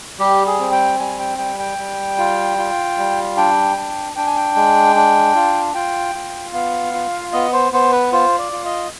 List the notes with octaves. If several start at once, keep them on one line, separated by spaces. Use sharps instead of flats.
G3 G4
G#4
C4
G5
G3 G#5
G5
G3 G5
G5
G3
F4
F4
G3
D4 G5
D4
D4 G5
G#5
G5
G#3
D4
F4
F4 G5
F4
B3 F5
F4
B3 D#5
C5
B3 C5
B4
F4 C5
D5
F4
D#5